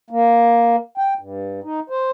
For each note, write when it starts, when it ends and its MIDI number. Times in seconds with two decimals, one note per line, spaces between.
0.10 0.76 58
0.98 1.14 79
1.19 1.60 43
1.64 1.80 63
1.90 2.11 72